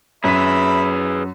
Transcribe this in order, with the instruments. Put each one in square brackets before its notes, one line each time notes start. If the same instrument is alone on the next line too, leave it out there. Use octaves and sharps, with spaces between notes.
[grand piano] F#2 B6 [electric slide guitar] G#4 B4 [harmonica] E5 B5